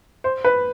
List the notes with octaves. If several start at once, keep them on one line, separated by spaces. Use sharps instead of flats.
C5
B4